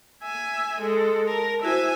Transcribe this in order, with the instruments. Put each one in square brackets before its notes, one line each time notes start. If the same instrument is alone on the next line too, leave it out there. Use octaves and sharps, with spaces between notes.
[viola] E5 G#5
G#3 A4
[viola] A#4 [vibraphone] A5
[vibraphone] E4 F#4 C5 [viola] E5 G#5